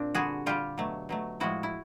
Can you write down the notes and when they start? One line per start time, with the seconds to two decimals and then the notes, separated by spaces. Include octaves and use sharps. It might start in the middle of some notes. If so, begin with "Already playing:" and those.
Already playing: A#2 C4 D4
0.15 D3 G3 F#4 G#4
0.46 D3 G3 F4 G4
0.78 B2 F#3 A3
1.09 B2 F#3 A3
1.40 A2 F3 G#3 E4 F#4
1.63 E4